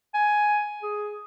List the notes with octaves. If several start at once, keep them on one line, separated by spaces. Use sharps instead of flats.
G#5
G#4